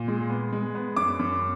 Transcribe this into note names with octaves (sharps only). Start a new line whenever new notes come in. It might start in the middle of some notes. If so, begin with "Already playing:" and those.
Already playing: A#2
G#3
B3
G#3
B3
F#2 D6
F#2